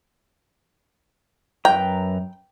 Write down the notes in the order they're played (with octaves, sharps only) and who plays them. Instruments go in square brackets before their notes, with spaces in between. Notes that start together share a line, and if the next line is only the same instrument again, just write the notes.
[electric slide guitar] F#2 B4 A#5 [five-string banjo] G5